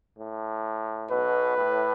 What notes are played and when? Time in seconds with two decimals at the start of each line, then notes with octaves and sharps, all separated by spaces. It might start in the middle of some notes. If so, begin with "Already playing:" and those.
0.16 A2
1.10 B1 B2 B4
1.58 A2